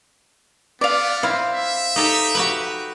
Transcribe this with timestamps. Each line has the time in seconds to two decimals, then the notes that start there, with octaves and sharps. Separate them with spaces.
0.81 B3 D5 F5
1.23 C4 E4 F5
1.55 E5
1.96 D#4 G4 A4
2.35 F#4 G4 B4